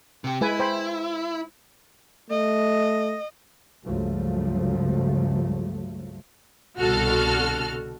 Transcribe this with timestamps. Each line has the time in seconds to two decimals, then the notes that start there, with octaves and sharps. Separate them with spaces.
0.24 C3 G4
0.41 G#3 E4 B4 G#5
0.60 C5 G5 B5
2.30 A3 D#5
3.84 C#2 G2 C#3 F3 F#3 A3
6.79 C2 B2 D3 F#4 A4 F6